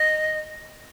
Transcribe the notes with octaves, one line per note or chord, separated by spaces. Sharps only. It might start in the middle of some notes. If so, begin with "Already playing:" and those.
Already playing: D#5